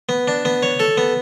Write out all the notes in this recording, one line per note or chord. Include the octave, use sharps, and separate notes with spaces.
B3
D4
B3
C#5
A4
B3